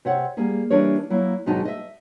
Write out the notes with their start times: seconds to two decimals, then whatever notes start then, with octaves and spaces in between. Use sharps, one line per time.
0.05 C3 C#5 F#5
0.37 G3 A#3 G#4
0.71 E3 G3 D4 A#4 C#5
1.10 F#3 A#3 E4
1.46 D#2 G#2 B2 F#3 D#4 A5
1.65 D#5 E5